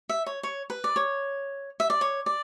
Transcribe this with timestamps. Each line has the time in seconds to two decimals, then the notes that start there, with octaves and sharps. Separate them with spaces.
0.09 E5
0.26 C#5
0.43 C#5
0.70 B4
0.84 D5
0.96 C#5
1.80 E5
1.90 D5
2.01 C#5
2.26 D5